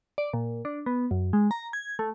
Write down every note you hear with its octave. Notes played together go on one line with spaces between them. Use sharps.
D5
A#2
D4
B3
F#2
G#3
A#5
G#6
A3